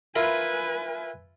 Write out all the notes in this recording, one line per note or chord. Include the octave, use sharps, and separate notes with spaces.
E4 F4 A#4 B4 G#5